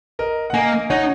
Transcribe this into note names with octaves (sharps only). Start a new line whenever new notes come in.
A#4 D#5
F#5
A#3 D#5 G#5
D#4 C#5 F#5